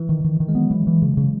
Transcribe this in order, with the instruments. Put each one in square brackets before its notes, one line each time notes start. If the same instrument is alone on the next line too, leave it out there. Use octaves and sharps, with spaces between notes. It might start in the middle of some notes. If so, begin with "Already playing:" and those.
Already playing: [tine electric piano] E3
[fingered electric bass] D#3
D#3
D#3
[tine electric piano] G#3
[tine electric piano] F#3 [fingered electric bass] B3
[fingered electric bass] E3
E3
C#3
C#3